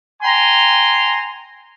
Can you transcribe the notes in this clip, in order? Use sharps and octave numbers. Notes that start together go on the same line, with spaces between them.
G5 G#5 A#5 C6